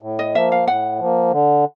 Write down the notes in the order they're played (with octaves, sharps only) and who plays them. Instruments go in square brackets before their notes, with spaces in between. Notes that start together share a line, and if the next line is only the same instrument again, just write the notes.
[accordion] A2
[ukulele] D#5
[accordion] F3 A#3 [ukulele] E5
[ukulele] F5
[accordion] A2 [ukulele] F#5
[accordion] F3 A#3
D3